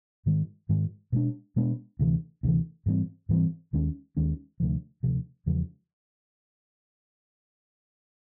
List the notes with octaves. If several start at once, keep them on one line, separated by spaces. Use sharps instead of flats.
G#2 D#3 G#3
G#2 D#3 G#3
B2 G#3 B3 D4
B2 G#3 B3 D4
D2 C3 E3
D2 C3 E3
G#2 E3 G3 C4
G#2 E3 G3 C4
D#2 D#3 G#3 C#4
D#2 D#3 G#3 C#4
D2 C3 F3
D2 C3 F3
E2 C#3 F3 G#3